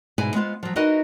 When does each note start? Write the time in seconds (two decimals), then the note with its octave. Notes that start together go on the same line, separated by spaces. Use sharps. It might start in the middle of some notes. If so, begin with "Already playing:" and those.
0.18 G#2 B2 B3 E4 G#4 G#5
0.34 G#3 B3 F4 C5
0.63 F3 F#3
0.76 D#4 E4 F#4 A#4 B4 D#5